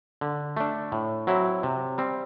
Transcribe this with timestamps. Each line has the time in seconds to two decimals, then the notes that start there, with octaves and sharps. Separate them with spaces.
0.21 D3
0.57 A3 D4
0.92 A2
1.27 F#3 C4 E4
1.63 C3
1.98 G3 C4